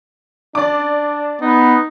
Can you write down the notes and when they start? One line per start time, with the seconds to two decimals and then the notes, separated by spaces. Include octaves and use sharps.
0.55 D4 D5 D6
1.42 B3 D#4